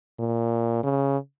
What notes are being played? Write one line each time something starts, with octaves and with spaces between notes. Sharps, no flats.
A#2
C#3